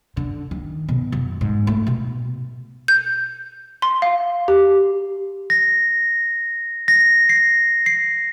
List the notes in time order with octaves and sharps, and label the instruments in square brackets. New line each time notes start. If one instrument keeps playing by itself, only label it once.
[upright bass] D3
D#3
B2
F#2
G#2
A3
B2
[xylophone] G6
C6
F5
G4
[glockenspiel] A#6
A#6
C7
C7